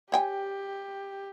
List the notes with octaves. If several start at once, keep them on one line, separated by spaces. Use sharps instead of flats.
G4 C#5 G5 G#5